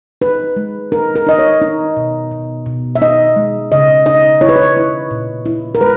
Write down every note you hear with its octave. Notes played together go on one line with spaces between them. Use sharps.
D#4 B4
G#3
D#4 A#4
A#4
D#4 D#5
C#5
D#4
B2
B2
B2
E5
D#4 D#5
G#3
C#3 D#5
D#4 D#5
E4 C#5
B4
C#5
E4
A#2
E4
A#4
G#3 B4